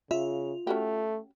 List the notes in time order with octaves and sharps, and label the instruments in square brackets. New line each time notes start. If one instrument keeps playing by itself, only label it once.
[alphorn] C#3 [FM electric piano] F4 [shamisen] E5
[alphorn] A3 [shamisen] C#4 F#4 G4